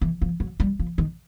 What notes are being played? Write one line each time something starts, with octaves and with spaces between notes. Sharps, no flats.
E3
F3
F#3
G3
F3
D#3